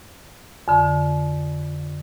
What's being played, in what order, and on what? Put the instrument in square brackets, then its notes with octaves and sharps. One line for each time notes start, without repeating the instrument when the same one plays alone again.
[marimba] F2 D3